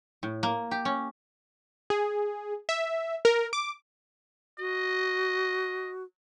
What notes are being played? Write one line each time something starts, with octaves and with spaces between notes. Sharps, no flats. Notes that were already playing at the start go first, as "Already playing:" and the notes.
A2
A#3
G4
C#4
G#4
E5
A#4
D6
F#4 D#5